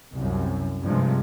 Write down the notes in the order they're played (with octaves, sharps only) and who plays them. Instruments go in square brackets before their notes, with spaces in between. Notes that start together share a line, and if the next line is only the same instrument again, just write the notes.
[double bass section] C2 F#2
G2 C3 F3 G#3